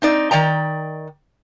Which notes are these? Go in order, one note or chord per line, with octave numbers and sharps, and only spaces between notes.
C4 D#4 D5
D#3 D5 G5 A#5